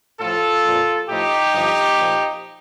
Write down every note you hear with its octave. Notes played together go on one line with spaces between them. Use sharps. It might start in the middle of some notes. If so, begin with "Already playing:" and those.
A2 F3 F4 A4
A#2 F3
A2 F3 D#4 G4
G2 D3 F3
A#2 F3